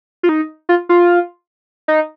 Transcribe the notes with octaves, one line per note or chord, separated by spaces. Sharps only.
F4
D#4
F4
F4
D#4